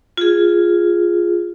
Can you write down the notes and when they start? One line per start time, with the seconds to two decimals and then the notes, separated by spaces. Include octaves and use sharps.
0.17 F4 G#4